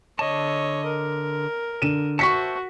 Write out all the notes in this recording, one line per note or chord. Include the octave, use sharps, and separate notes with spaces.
D3 C#5 D#5 A5
A#4
D3 D#7 E7
F#4 C5 E5 A5 C#6 B6 C#7